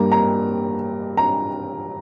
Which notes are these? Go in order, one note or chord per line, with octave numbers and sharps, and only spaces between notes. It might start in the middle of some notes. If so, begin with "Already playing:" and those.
Already playing: G2 G3 A#3 A#5
A#5
A#5